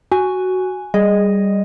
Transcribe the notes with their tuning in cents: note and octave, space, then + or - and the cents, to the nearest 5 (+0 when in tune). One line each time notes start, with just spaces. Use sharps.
F#4 +5 G#5 +0
G3 +0 G#4 +0 D#5 +0